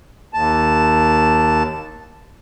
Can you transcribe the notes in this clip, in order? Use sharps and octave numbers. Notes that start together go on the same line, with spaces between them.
D#2 A5